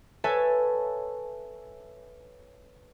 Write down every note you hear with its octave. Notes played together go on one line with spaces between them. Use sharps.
A4 B4 C#5 E5 G#5 A5